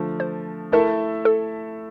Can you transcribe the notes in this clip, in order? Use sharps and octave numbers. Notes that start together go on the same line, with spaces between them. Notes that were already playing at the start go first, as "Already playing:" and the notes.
Already playing: D3 F3 A3
C5
A3 E4 A4 A#4 E5
A4